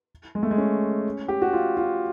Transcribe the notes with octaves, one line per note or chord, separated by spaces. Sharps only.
G#3
A3
G#3
C#4
G4
F#4
F4
F4